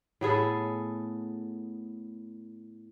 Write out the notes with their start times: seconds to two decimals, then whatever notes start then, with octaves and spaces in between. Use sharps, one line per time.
0.21 A2 B3 G#4 A4